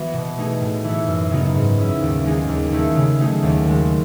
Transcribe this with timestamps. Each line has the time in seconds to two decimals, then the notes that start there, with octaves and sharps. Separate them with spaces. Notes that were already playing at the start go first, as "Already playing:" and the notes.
Already playing: E3 B3 F#4
0.13 B2
0.37 A3 D#4 G#4
0.61 A2
0.84 E3 A3 E4
1.07 F#2
1.31 C#3 F#3 B3 D#4
1.55 G#2
1.79 F#3 C#4 E4
2.01 D#2
2.25 D#3 G#3 D#4 G#4
2.49 D#2
2.72 D#3 A3 E4 G#4
2.96 C#3
3.19 F#3 A3 D#4 G#4
3.43 D#2
3.66 D#3 G#3